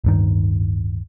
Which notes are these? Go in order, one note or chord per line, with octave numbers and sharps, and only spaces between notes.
D1 G2 D#3